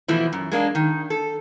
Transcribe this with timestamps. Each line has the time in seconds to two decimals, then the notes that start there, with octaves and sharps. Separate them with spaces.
0.08 B2 E3 F3 A3 E4
0.33 F#2
0.52 G#3 A#3 D4
0.75 D#3
1.10 A4